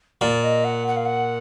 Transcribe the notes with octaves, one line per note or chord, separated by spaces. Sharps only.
A#2 D5
D#5
F#5
F#5
F5
F#5